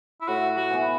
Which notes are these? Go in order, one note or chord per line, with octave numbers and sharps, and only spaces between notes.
E4
A2 F#4
F#4
E3 B3